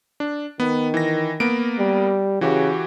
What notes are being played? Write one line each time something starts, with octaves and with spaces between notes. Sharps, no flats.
D4
D#3 B3
E3 A#6
A#3 B3 D7
G3
C#3 E3 F#4 G4